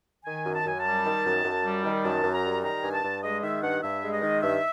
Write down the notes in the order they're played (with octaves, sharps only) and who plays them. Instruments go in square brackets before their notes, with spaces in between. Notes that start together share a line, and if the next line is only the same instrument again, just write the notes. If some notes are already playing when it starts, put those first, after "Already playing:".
[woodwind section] D#3 G#5
F#2
A5
F#2 G#5
G3 A5
D#3
F#2
F#2
G3
D#3
F#2 A5
F#2
A#5
G3
D#3 A#5
G2 G#5
A5
G2
G#3 D#5
D#3 E5
G2 F#5
G2 E5
G#3
D#5
D#3
G2 E5